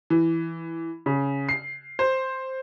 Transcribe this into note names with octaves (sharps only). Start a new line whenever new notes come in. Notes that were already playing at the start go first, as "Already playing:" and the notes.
E3
C#3
C7
C5